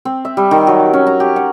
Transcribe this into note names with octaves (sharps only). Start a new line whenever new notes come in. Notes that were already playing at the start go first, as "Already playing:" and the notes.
C4
E5
G3
D#3
F#3
D6
C#4
A#5
G4
F#5